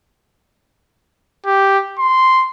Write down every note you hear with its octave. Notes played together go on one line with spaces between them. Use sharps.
G4
C6